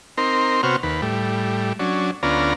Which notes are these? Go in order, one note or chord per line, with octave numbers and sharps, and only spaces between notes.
C4 D#4 A#4 C6
C3 B3 F#4 C5 C#5 F6
D#2 B4
A2 G3
F#3 C#4 D4
D2 B3 C#4 F4 D5 A#5